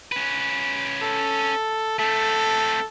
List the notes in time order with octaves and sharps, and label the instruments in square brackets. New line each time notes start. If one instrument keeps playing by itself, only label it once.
[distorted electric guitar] C#4 B4
[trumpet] A4
[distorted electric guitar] A3 C4 [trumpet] A4